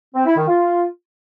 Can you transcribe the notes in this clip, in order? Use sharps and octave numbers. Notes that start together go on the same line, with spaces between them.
C4
E4
D#3
F4